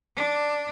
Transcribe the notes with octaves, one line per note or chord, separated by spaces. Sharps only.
D4